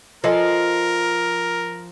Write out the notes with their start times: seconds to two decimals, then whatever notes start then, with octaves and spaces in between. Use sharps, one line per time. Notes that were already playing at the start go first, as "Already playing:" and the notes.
0.24 F3 A4 A#4 D#5 G#5